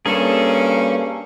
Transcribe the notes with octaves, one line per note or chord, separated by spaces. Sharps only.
G2 A#3 C#4 G#4 A4